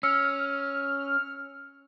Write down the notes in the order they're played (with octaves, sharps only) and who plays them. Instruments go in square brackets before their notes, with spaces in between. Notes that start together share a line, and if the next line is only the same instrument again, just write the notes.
[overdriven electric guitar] C#4 [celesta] E6 C#7 [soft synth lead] F6